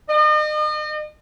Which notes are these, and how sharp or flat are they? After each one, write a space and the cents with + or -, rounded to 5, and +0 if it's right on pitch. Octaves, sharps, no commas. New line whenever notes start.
D#5 -40